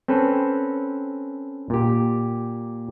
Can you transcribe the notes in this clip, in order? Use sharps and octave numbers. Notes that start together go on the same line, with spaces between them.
C4 C#4 A4 B4
A#2 G4